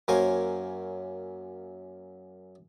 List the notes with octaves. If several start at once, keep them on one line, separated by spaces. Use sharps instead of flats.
F#2 A#3 A#4 C5 C#5 G#5